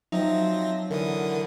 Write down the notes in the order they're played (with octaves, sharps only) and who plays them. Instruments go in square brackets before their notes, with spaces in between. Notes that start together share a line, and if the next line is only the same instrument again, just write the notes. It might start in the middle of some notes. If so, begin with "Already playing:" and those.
[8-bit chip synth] F3 C4 A#6 [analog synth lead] F#3 [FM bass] D#4 [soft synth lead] E5
[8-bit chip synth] D3 E3 D#6 [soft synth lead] A#4